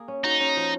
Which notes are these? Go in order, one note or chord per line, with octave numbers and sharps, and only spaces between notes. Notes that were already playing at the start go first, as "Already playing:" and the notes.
Already playing: A#3 G#4
C#4
D#4 F#4
C#4
F3